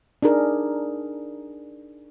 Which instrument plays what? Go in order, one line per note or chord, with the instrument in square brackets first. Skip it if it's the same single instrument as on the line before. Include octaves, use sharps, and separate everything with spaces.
[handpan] D4 D#4 G#4 A#4